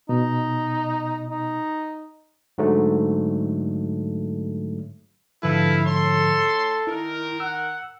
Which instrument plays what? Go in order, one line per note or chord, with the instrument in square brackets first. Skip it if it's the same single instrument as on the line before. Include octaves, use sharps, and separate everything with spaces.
[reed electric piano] B2 [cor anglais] D#4
[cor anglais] D#4
[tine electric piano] G#2 D3 F#3 A3
[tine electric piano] G#2 D3 F3 [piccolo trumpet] E4 [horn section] A4 B4 F5
[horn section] A2 C#5 C6 [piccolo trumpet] A4
[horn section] D#3 A#4 [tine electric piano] E4
[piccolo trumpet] F#5 [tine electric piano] E6